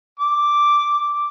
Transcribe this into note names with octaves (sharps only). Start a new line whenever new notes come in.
D6